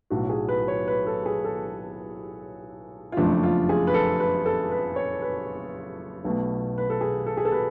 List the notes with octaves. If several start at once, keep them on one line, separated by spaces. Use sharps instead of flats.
B1 A2 F#3 F#4
G#4
B4
C#5
B4
A4
G#4
A4
F4
F#1 F2 F3 A3 D4
F4
G#4
B4
A4
B4
A4
B4
C#5
B4
B1 B2 A3
B4
A4
G#4
A4
G#4
A4
B4